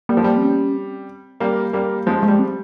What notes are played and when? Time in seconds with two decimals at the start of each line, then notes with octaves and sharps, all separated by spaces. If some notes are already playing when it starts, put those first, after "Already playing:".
0.09 G3 A#3
0.17 F3
0.24 G3
0.37 C4
0.42 C#4
0.75 C4
1.40 G3 A#3
1.73 G3 A#3
2.06 F3 G#3
2.23 G#3
2.28 G3
2.39 C4